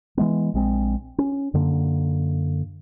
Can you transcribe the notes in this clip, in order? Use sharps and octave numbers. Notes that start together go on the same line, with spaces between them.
E3 G#3 B3
A#1 G#3 C4
C#4
F#2 D3 A#3